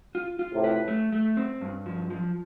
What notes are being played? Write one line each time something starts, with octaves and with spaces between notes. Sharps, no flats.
F4
F4
A2 C3
B4
A3
A3
C4
G2
F3
F3